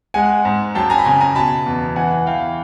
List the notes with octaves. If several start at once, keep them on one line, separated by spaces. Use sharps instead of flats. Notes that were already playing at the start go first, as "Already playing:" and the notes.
G#3 F#5 G#5
G#2
F#2 G5 A5
G#5 A#5
B5
C#3 G#5 A#5
G#5 A#5
B2 A5 B5
E2
E3 F#5 G#5
E3 F5 G5